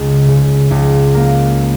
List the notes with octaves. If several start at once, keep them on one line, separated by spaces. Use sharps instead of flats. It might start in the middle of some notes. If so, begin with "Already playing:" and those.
Already playing: C#2 C#3
C#3
C#2
A#3